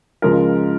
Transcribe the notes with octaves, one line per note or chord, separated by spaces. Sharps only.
C#2 C#3 F3 G#3 A#4